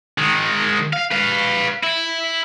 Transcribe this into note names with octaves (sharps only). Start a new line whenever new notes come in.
D#3 G#3
F5
B4 F5
E4